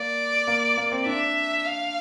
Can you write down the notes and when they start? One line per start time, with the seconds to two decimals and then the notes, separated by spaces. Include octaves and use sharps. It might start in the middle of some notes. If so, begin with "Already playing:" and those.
Already playing: A#3 D5
0.48 A#3
0.77 A#3
0.92 C4
1.06 D4 E5
1.64 F5